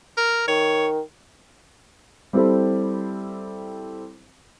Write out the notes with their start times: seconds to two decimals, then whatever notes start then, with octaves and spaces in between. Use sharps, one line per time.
0.17 A#4
0.48 D#3 C#5
2.33 G3 C4 E4 G4 A4 C5